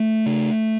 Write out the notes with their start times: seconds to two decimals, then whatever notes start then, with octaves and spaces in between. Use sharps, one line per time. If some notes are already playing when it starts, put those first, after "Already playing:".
Already playing: A3
0.26 C#3